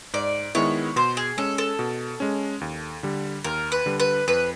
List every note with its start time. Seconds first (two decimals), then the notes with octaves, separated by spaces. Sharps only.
0.13 G#2 D5
0.55 D#3 G#3 B3 E4 C#5
0.96 B2 C5
1.17 G#4
1.37 G#3 C#4 A4
1.58 A4
1.79 B2
2.20 G#3 C#4
2.61 D#2
3.03 D3 G3
3.44 D#2 A#4
3.72 B4
3.86 D3 G3
4.00 B4
4.27 F2 B4